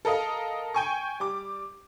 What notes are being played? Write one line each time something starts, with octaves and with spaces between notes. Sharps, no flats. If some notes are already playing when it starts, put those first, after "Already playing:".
A4 A#4 D#5 F5
G5 G#5 C#6
G3 D6